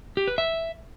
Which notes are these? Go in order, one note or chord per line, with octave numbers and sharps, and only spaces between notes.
G4
B4
E5